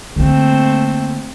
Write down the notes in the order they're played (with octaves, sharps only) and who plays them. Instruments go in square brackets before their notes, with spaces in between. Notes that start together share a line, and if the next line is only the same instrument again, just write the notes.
[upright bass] D3 A#3 [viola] A3 C4